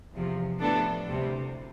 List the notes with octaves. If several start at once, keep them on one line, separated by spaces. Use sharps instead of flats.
E2 C3 F3
A2 F3 B3 D4 A4
D2 C3 G3